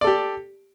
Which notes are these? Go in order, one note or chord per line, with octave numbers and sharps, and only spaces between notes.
G4 A4 D5